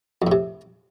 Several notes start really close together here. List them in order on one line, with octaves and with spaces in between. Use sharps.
F2 A2 C3